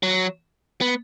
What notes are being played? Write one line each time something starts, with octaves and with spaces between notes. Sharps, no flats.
F#3
B3